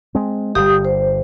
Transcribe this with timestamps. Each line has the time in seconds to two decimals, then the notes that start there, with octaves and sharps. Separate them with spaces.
0.15 G#3 C4
0.55 G1 D3 G3 G4 D#6
0.85 C5